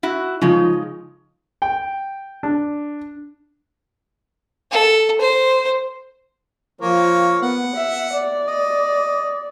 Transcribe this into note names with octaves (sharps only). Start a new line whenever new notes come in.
E4 F#4
C#3 F3 G#3 D#4
G5
D4
A4
C5
F3 A#3 C#5 F5
B3 F#5
E5
D5
D#5